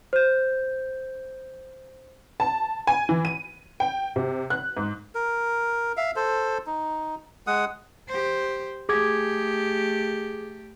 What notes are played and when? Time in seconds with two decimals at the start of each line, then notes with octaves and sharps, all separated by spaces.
0.13 C5 G6
2.40 A5
2.87 G#5
3.09 E3
3.25 D#7
3.80 G5
4.16 C3
4.50 F#6
4.77 G#2
5.15 A#4
5.97 E5 F5
6.16 A4 C5
6.66 D#4
7.47 G#3 F#5 D#6
8.09 G4 C5
8.89 A3 G4 G#4 D6 G#6